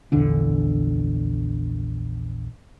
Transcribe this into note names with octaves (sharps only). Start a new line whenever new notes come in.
A#1 E2 D3 D4